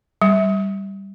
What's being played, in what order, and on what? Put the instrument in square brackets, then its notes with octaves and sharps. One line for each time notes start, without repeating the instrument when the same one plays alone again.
[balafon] G3